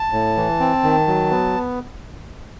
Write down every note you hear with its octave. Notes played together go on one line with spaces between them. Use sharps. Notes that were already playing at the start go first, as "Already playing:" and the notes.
Already playing: A5
A2
E3
C4
D#3
F#3
B3